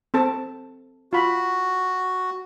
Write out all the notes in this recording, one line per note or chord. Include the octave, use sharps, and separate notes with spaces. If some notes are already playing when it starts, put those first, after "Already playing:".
C4 A4 A5
F4 F#4 B5